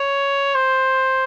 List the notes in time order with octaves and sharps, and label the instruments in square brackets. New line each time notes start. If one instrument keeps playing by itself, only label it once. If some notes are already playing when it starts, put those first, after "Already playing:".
Already playing: [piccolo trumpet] C#5
C5